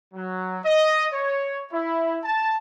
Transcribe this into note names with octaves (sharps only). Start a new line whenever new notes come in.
F#3
D#5
C#5
E4
A5